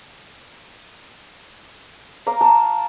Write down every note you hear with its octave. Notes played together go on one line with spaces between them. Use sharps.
F5 A#5 D6
A5